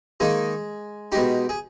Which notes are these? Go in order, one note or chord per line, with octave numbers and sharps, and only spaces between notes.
D#3 G#3 A#3 D#4 G#4
B2 G#3 D#4 G4
G#4